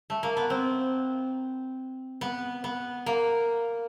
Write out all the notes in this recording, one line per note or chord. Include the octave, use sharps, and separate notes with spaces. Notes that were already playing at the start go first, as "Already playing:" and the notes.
A3
A#3
B3
C4
B3
B3
A#3